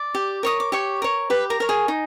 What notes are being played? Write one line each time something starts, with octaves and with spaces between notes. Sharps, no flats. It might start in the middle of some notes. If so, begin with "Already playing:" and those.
Already playing: D5 D6
G4
A#4 C#5 D#6
D6
G4 C#5 C#6
A#4 C#5
G4 B4 B5
A#4 A#5
A#4 C#5
G#4 G#5
D#4